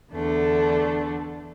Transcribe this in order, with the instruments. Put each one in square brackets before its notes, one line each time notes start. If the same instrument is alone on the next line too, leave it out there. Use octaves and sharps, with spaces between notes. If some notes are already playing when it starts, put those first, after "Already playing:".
[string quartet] E2 D3 A3 D4